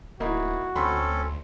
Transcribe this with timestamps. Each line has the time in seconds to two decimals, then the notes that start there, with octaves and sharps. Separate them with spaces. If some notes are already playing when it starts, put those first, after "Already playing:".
0.20 D1 A#3 D#4 E4 F#4
0.76 D2 C4 C#4 A4 B5 C6